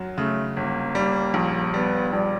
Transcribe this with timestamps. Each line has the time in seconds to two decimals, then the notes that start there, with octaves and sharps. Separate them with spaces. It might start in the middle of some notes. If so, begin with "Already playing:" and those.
Already playing: F#2 F#3
0.17 C#3 A3
0.56 G1 A#3
0.95 G3
1.34 A#1
1.74 G3 B3
2.13 A#1 G3